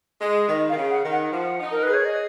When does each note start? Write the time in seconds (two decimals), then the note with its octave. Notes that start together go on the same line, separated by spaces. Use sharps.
0.21 G#3
0.48 D#3 D#5
0.69 D#3 F5
0.77 C#3
0.90 F#5
1.04 D#3
1.11 F#5
1.32 F3 F#5
1.60 D#4
1.71 A#4
1.83 B4
1.88 G#4
1.93 C#5
2.05 D#5